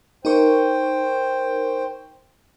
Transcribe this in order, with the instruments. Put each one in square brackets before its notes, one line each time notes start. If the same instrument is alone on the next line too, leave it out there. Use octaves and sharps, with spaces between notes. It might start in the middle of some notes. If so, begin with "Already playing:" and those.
[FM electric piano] D#4 A#4 C#6 [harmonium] C5 G5